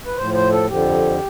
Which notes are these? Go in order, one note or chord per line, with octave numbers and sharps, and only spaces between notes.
B4
A2 F3 C5
C5
A4
F2 D3 F3 G4